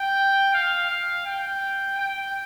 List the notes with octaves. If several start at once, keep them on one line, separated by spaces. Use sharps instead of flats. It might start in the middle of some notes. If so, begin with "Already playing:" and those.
Already playing: G5
F5
F5
G5
G5